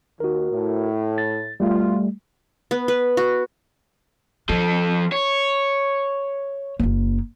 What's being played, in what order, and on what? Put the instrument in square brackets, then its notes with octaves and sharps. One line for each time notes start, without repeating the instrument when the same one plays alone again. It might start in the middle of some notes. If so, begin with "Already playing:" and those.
[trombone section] D#2 [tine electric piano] F#4 A#4
[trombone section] A2
[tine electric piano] A6
[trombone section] B2 F4 [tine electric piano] G3 A3
[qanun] B3
B4
F#4
[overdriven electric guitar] F3 A4 [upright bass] D4
[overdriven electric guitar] C#5
[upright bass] F#1 A#3